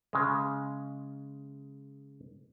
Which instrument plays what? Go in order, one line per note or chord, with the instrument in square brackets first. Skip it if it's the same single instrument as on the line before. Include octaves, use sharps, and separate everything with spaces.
[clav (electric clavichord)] C#3 G#3